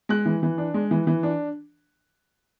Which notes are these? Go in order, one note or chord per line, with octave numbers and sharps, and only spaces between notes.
G#3 F#6
E3
E3
D4
G#3
E3
E3
D4